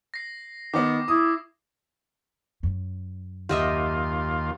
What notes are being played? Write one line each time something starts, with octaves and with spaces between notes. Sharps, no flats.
A#6 C7
D#3 B3 D6
E4 D#6
F#2
D#2 F4 G4 D#5 E5